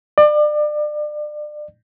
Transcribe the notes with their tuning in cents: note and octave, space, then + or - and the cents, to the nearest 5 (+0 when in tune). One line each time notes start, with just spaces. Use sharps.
D5 +30